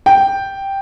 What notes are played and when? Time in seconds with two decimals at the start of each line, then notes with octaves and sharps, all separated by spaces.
0.06 G5